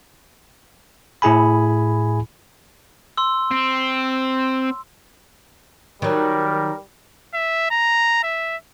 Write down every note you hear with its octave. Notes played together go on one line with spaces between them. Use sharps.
A2 E4 G#4 G#5 B5
C6 E6
C4
D#3 F#3 G3 A#4
E5
A#5
E5